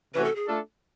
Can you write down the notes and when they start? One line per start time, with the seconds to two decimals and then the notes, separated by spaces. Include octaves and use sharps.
0.14 C3 E3 A3 C#4 F#4 B4
0.25 A4
0.36 G#4
0.47 A3 D4 F4 A4